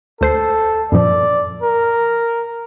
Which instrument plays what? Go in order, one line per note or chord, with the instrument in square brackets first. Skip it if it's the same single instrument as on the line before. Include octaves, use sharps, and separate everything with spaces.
[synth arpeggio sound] D2 C5 C7 [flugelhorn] A4
[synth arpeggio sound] F#2 A#2 F3 [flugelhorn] D5
[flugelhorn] A#4